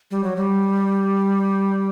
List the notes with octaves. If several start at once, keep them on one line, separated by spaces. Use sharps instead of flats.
G3
F#3
G3